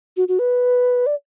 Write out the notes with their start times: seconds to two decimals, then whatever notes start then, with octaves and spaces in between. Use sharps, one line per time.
0.17 F#4
0.28 F#4
0.39 B4
1.06 D5